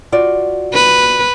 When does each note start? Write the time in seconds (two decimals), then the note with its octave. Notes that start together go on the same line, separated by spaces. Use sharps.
0.12 F4 F#4 D5
0.74 B4